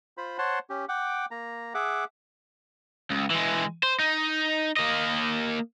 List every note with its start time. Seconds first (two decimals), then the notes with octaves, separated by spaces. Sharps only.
0.18 F4 C5 B5
0.38 C5 C#5 F#5 A5 C6
0.70 C#4 G4
0.89 F#5 G5 D6
1.31 A#3 A#5
1.74 G#4 E5 F#5 D6
3.10 C#2
3.30 E3 G#3
3.83 C5
3.99 D#4
4.77 A#3 D#5